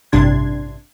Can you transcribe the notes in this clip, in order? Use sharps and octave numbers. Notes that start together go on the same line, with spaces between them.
A1 G2 C3 D4 C6 G#6